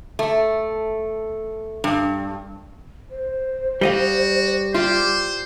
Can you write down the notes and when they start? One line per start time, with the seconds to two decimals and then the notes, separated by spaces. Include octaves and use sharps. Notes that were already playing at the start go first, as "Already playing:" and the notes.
0.19 A3
1.84 G2
3.11 C5
3.81 G3 F#4 D#5 F5
4.74 F4 G4 C5 D5